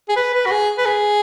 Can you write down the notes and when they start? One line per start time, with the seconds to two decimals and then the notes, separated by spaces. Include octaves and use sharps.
0.09 G#4
0.16 B4
0.34 B4
0.46 F#4
0.51 G#4
0.78 B4
0.86 G#4